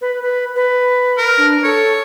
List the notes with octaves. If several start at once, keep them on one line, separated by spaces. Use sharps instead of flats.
B4
B4
B4
A#4
D4
A4 C#5